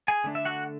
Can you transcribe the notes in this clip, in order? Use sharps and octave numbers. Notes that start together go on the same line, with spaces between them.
G#4 G#5
D3 A3 D4
E5
F#4 F#5